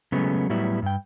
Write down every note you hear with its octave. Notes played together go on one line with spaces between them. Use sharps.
C#3 F#3 G#3 A3 B3 C#4
A2 F#3 G3 B3 E4
G2 G5